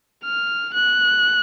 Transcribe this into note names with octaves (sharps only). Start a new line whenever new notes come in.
F6
F#6